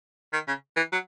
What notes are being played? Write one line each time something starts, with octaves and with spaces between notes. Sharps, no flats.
D#3
C#3
E3
F#3